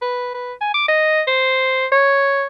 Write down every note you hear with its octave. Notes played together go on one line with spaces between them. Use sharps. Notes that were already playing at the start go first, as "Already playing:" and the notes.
B4
B4
G#5
D6
D#5
C5
C#5